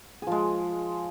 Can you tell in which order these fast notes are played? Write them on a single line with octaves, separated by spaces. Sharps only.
G#4 F3 G#3